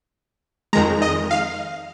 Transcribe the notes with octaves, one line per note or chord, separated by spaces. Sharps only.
F2 D#3 G#3 A#5
D#5
F5